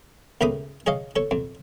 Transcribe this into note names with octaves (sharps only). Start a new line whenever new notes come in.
C#2 A2 A#4 B5 D6 D#6
G#4 C#5 D#5 F5
A4 C#5
F2